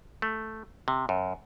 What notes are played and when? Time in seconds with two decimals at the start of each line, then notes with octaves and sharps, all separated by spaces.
0.22 A3
0.88 C3
1.09 F#2